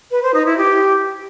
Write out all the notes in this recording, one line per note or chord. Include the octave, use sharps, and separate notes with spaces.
B4
C5
D#4
E4
G4